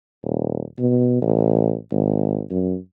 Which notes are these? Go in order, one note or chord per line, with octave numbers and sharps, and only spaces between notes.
D#1
B2
A1
G#1
F#2